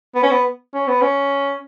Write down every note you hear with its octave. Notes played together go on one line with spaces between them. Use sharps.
B3
C#4
B3
C#4
B3
C#4